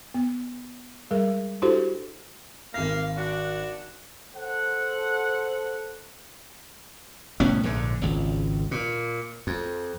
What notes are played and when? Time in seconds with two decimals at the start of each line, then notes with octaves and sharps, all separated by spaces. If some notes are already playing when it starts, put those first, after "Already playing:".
0.14 B3
1.11 G3 G#3 G#4 A#4
1.62 D4 E4 F#4 G4 A4 C5
2.74 G#1 A#3 F5 A#6
3.17 D4 F#4
4.34 A4 C5 F#5
7.40 C2 A2 B3 C#4
7.63 A#1 G#2 D3
8.02 G#1 C#2
8.71 A#2
9.47 F2